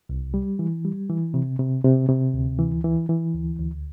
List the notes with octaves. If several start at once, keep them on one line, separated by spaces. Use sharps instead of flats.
C2
G3
E3
G3
E3
C3
C3
C3
C3
D2
E3
E3
E3
D2
D2